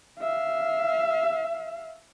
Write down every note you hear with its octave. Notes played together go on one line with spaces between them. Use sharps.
E5 F5